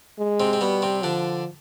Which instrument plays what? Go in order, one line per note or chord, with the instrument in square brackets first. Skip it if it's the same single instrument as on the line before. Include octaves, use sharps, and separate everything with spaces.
[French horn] G#3
[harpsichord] C3 C4
C4
[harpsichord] B2 B3 [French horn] G3
[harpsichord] C3 C4
[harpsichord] D3 D4 [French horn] F3